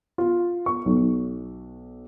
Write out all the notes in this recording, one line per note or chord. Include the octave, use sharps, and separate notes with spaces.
F4
C#6
B1